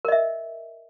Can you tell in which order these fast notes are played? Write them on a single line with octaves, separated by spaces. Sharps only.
A#4 D#5 E5